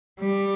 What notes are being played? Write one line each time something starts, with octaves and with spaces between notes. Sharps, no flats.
G3